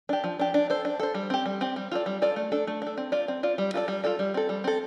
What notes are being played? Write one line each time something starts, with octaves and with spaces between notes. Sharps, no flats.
D4 G4
F3
D4 G4
D4
A4 C5
D4
A4 C5
G3
C4 G4
G3
C4 G4
G3
F4 A4 D5
G3
F4 A4 D5
A3
D4 A4
A3
D4 A4
C4
F4 D5
C4
F4 D5
G3
F4 A4 D5
G3
F4 A4 D5
G3
C4 A4
G3
C4 A4